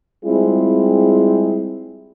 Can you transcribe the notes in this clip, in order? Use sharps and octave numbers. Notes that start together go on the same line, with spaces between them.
G3 G#3 C4 E4 F4 G#4